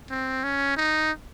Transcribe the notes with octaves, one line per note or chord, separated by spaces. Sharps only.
C4
C#4
D#4